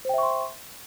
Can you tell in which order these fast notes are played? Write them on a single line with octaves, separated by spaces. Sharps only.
C5 G5 E5 C#6 C6